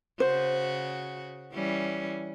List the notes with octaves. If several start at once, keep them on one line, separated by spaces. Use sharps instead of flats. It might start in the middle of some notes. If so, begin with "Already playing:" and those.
C#3 F#4 C5
E3 G3 C#4